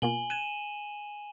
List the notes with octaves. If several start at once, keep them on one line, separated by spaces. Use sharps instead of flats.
B2 A#3 F4 G#5 F#7 G7
F#6 G#6 D#7 E7